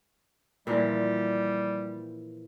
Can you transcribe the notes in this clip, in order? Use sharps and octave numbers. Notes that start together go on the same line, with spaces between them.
A#2 E3 F3 G3